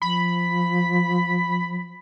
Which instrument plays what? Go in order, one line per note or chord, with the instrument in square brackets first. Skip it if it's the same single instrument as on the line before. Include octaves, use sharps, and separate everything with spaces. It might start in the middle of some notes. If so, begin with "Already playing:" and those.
[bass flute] F3 [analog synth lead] B5